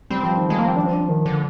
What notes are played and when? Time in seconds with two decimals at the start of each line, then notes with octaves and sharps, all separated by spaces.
0.10 G3 C4
0.23 F3
0.37 D#3
0.49 F3 G#3
0.58 A#3
0.68 C4
0.76 F3 D4
0.86 C4
0.93 D4
1.09 D#3
1.26 D3